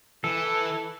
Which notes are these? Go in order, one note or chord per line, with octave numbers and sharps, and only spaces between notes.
E3 A4